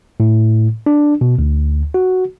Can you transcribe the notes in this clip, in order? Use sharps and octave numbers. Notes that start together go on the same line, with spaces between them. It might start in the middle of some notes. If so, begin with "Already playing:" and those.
A2
D4
B2
D2
F#4